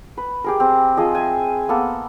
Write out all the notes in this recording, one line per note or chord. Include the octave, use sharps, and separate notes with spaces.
B4
G4 G#4 A#4
C4
F3 G#4 D#5
E5 G#5
A#3 B3 A4